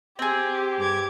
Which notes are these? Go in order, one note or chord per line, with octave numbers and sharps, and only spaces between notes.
C4 G4 G#4
G2 D6 G#6